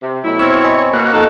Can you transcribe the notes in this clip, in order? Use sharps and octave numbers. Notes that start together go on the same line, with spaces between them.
C3
B2 F#3 A3 E4
B2 C4 C#5 E6 F6 G#6
D#5 G#5 B5
B2 A#3 F#4
F2 D#4 A4